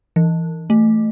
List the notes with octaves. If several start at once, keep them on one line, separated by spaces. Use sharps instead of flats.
E3
A3